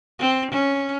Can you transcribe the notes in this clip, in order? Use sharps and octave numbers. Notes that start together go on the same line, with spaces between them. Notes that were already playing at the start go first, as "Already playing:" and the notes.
C4
C#4